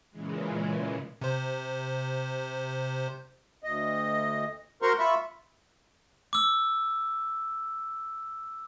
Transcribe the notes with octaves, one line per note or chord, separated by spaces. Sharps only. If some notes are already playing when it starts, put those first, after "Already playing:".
A#2 C#3 E3 G#3
C3 C5
D2 D#5
F#4 A#4 C5 A#5 C6 C#6
F4 E5 B5 C#6
D6 E6